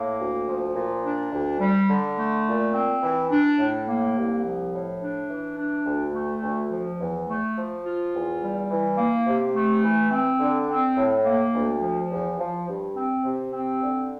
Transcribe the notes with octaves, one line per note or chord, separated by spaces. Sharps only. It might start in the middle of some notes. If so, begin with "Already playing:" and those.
Already playing: A2 A#3
D2
F3
A#2
D4
D2
G3
D3
A3
A#2
C4
E3
D4
A2
A#3
C2
F3
A2
D4
E3
D4
D2
A3
D2
F3
E2
A3
F3
F4
E2
G3
E3
A#3
C3
A3
E3
C4
D3
C4
A2
A#3
D2
F3
E2
F3
G2
C4
C3
C4
D3